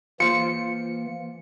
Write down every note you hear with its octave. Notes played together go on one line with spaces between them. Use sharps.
E3 A#3 F4 C5 C#7